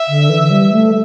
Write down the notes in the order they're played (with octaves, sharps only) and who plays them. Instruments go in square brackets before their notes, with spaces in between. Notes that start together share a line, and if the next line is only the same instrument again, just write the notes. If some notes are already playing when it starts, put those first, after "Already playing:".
Already playing: [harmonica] E5
[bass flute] D3
E3
G3
A3